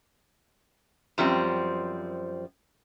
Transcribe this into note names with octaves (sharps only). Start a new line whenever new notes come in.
F#2 F3 G3 C4